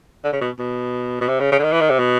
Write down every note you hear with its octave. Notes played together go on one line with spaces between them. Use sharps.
D3
C#3
B2
B2
B2
C3
C#3
C#3
D3
D#3
E3
D#3
C3
B2